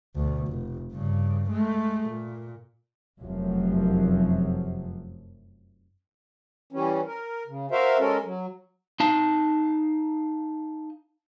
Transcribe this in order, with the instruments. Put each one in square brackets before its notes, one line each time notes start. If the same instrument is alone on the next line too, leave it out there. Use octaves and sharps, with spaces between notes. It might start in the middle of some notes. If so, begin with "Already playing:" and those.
[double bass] D2 B2
F1
G2 C#3
G#3 A3
A#2
[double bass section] F1 F#2 C3 F3 F#3
[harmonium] E3 G3 C#4
A#4
C#3
F#4 A#4 C5 E5 F5
G#3 C#4 A4 A#4
F#3
[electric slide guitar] D#4 F5 A5